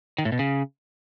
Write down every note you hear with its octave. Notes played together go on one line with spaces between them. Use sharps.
D#3
A2
B2
C#3